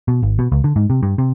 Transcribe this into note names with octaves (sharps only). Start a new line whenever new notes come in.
B2
G#1
B2
C#2
D3
G#2
C3
G2
C3